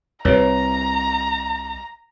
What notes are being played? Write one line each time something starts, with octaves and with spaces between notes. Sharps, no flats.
C2 C3 B4 C#5 A#5